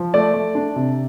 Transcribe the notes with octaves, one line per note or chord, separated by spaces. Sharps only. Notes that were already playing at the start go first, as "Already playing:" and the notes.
Already playing: F3
A3 D5
A3
D4
C3